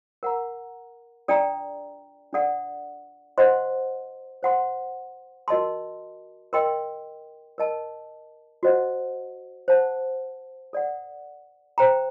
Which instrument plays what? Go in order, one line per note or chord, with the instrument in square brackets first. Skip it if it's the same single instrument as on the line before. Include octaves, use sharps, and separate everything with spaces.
[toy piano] A#4 F#5 A#5
D4 A4 D5 G5 A#5
D4 A4 D5 F#5
C5 D#5 F#5 C6
C5 F#5 C6
F#4 A#4 D#5 A5 C6
A#4 D#5 G5 C6
A#4 D#5 A5
F#4 C5 D#5 F#5
C5 F#5 A5
A4 D5 F#5
C5 G5 A#5